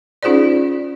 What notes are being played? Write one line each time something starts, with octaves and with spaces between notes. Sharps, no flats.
C#4 D#4 F4 G#4 C5 D5